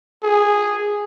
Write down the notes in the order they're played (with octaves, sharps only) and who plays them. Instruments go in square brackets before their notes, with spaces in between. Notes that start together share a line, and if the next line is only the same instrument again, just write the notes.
[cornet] G#4